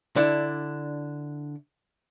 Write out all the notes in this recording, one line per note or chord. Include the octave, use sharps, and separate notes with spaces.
D3 D4 E4